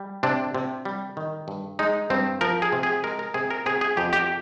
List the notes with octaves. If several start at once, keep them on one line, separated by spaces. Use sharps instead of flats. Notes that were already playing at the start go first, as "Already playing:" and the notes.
Already playing: G3
C3 D4
C3
G3
D#3
G2
G#3 D#4
G2 C4
F3 A#4
G#4
C3
G#4
G#3 A#4
A#4
C3 G#4
A#4
C3 G#4
G#4
F2 G4
G4